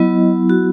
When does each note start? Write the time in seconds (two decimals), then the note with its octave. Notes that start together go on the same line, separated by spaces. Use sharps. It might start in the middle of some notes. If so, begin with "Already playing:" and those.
Already playing: F#3 B3 E4 D#5
0.50 F#4